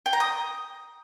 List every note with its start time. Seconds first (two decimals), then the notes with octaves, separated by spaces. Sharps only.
0.06 G5
0.13 A#5
0.20 D#6